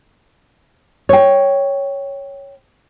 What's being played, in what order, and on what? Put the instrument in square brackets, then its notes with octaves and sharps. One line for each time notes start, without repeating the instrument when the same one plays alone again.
[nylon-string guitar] C#5 G5